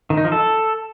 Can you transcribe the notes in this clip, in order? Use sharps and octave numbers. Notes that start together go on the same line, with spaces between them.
D#3
D#4
F3
A4